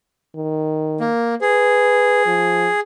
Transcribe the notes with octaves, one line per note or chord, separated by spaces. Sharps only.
D#3
A#3
G#4 B4
F3